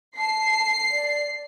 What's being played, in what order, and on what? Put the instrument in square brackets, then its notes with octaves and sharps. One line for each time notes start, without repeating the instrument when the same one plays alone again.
[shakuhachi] A5 [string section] C7
[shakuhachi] D5